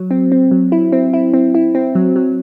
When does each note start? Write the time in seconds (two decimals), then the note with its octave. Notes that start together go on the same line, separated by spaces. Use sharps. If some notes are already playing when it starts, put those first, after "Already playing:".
Already playing: F#3
0.11 C4
0.32 C4
0.51 F#3
0.72 E4
0.92 C4
1.13 E4
1.34 C4
1.55 E4
1.75 C4
1.95 F#3
2.16 F#3